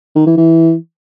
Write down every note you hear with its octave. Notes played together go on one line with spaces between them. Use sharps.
D#3
E3
E3